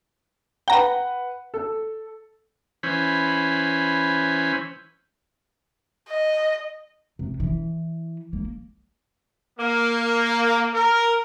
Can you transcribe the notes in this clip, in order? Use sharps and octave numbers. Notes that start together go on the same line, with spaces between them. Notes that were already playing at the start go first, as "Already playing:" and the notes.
B4 F#5 G5 A#5
A4
E3 C#4 C5 B5
D#5
C3
E3
A#3
A#3
A#4